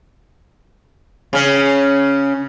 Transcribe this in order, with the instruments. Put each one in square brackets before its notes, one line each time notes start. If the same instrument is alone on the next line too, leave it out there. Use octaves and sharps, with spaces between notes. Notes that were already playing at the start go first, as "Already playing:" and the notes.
[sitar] C#3 C#4